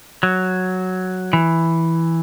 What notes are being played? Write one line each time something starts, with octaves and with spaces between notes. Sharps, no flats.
F#3
E3